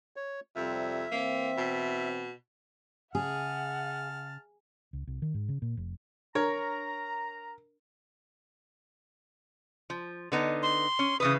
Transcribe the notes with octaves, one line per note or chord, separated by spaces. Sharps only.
C#5
F2 C3 G3 E5
E3 A#3 C4
B2
C#3 G#4 E5 F#5 A5 F6
C#2
C2
D#3
G#2
C#3
A#2
F1
D4 A#4 C#5 A#5
F3
D3 B3 D#4
C6
C#4
C#3 E3 B4 D#6